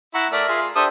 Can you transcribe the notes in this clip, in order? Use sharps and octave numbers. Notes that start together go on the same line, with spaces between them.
E4 F#5 A#5 C#6
A3 A#4 D5 E5
F4 G#4
D4 G4 A4 C5 E5 D#6